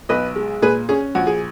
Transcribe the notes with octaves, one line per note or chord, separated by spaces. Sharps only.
B1 B4 D#5
G#3
A#2 G#4 B4
C#4 G#4
A#1 F#4
G#4